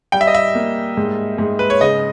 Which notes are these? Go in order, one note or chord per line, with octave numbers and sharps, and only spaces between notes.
G3 G5
E5
D#5
E5
A#3
G#2
G#2
B4
C#5
C#3 D#5